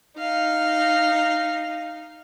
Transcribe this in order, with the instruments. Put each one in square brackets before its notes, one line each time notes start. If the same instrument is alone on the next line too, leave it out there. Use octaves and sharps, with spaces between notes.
[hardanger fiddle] D#4 F5